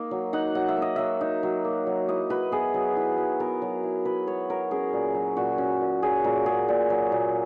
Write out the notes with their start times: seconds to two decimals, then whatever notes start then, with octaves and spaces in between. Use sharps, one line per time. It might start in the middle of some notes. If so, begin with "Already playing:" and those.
Already playing: A#3 D#4
0.11 F#3
0.33 D#4 F#5
0.55 F#3 F#5
0.69 E5
0.77 A#3
0.82 D#5
0.96 F#3 E5
1.21 D#4
1.43 F#3
1.65 A#3
1.87 F#3
2.08 E4 D#5
2.30 F#3 B4
2.52 B3 G#4
2.74 F#3
2.97 E4
3.17 F#3
3.39 B3 A#4
3.62 F#3
3.83 E4
4.05 F#3 B4
4.27 B3 C#5
4.49 F#3 A#4
4.71 C#4 G#4
4.93 A#2
5.15 F#3
5.37 A#2 F#4
5.58 C#4
5.81 A#2
6.03 F#3 G#4
6.24 A#2 A#4
6.46 C#4 G#4
6.68 A#2
6.90 F#3
7.12 A#2